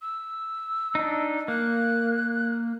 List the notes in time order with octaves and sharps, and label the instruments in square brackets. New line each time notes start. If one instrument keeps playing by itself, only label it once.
[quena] E6
[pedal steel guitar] D4 D#4
[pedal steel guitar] A#3 [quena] F#6